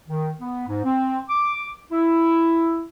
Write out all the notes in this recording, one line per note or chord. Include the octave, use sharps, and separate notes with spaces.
D#3
B3
G#2
C4
D6
E4